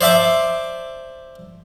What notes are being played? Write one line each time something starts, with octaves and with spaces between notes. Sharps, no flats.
C5 D5 E5 A5 D6